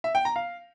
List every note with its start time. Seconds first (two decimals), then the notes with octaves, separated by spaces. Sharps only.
0.04 E5
0.15 G5
0.25 A#5
0.36 F5